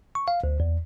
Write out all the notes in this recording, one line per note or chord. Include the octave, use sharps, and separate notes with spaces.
C#6
F5
D2
E2